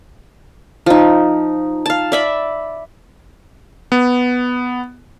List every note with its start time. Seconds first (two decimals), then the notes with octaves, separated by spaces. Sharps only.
0.86 F3 D#4
1.86 F5 A5
2.12 D5 E5 B5
3.92 B3